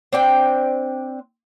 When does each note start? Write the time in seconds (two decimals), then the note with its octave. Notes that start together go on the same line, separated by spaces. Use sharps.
0.13 C4 D4 G5